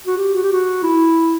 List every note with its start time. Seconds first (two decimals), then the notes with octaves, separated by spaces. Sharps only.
0.07 F#4
0.17 G4
0.34 F#4
0.43 G4
0.52 F#4
0.83 E4